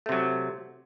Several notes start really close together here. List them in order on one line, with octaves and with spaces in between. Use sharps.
A3 C3 F#3